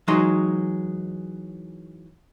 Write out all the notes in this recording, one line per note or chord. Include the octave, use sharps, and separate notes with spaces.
E3 F#3 G#3 D#4 C6